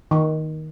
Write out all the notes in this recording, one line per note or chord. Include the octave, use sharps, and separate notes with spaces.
D#3